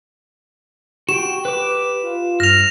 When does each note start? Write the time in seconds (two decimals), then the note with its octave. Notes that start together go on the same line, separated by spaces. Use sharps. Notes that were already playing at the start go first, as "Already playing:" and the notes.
1.09 F#4 G4 G5 E7
1.45 B4 D6
2.03 F4
2.40 G2 F6 A#6 F7